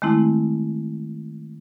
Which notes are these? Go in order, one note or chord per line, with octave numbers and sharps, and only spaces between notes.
D#3 G#3 A3 C4 E4